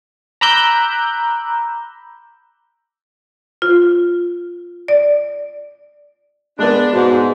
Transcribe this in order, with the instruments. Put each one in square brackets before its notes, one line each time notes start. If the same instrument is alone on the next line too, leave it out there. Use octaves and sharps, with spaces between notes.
[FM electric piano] A#5 B5 D6 E6 F#6 G6
[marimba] F4
D5
[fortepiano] G#3 B3 [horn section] D4
[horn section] G#2 [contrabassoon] B2